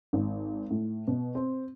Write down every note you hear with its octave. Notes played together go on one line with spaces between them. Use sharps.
G#1
A2
B2
C4